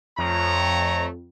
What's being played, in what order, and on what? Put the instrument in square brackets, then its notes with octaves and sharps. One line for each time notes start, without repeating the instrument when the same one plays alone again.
[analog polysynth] F2 [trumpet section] A3 C#5 A#5